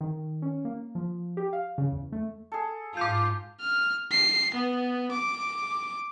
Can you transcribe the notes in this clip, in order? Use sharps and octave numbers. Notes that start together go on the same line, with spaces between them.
D#3
C#4
A#3
F3
G4
F5
C#3
E2
A3
G#4 A4
G#2 F4 D6 G6
F6
C7
B3
D6